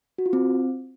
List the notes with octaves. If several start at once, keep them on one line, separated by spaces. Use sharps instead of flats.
F#4
F4
C4